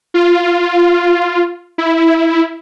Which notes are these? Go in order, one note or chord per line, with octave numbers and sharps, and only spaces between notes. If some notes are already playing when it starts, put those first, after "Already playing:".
F4
E4